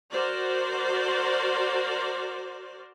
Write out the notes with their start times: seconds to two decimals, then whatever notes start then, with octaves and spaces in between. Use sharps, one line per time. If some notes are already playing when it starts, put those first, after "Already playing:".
0.11 F#4 A#4 C5 D5